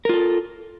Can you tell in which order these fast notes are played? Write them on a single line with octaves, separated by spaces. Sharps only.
A#4 F4 A4